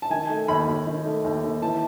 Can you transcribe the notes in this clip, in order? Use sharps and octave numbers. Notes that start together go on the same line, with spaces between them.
A5
D#3 G#5
A3
D#2 B5
D#2
D#3
A3
D#2
D#2
E3 A5